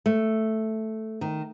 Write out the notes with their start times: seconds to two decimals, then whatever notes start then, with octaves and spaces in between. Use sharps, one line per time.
0.06 A3
1.21 D#3